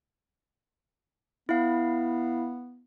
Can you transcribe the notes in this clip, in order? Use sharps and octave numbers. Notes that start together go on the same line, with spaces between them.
B3 E4 F5